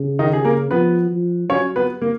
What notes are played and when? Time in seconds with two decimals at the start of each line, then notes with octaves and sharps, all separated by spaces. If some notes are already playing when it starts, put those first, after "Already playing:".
Already playing: C#3
0.19 D#3 D#4
0.33 G#4
0.45 A#3 A#4
0.71 F3 B3 B4
1.11 F3
1.49 F#3 C#4 C#5
1.76 B3 B4
2.01 A#3 A#4